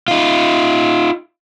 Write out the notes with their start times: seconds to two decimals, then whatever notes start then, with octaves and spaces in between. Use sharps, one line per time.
0.08 D#4 F4